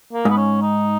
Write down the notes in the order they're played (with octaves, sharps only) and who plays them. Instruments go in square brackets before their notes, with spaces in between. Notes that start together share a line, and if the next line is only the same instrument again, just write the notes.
[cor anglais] A#3
[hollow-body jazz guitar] G#2 [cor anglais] B3
[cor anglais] C#4
D#4